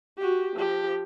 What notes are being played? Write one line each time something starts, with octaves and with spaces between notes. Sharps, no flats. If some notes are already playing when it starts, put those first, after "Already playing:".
F#4 G4
F3 G4